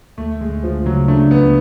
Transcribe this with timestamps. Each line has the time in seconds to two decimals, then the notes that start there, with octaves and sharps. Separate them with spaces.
0.18 D2 A3
0.41 D2 G#3
0.63 D2 F3
0.86 C#3 F#3
1.08 A3 D4
1.31 C#2 B3